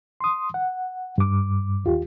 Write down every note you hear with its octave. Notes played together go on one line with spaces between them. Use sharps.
C6 D#6
F#5
G2 D6
D#2 F4 G4